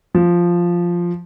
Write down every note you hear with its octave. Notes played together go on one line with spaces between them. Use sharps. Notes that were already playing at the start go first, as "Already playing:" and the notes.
F3